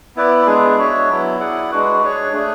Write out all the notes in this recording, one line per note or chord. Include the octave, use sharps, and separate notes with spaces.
B3 E4 B4 D5
G#3 B3 D4 G#4
D4 F#4 C#5 E5
F#3 B3 E4
E4 G#4 D5 F#5
G#3 D4 F#4 B4
D4 G#4 C#5
A3 D4 G#4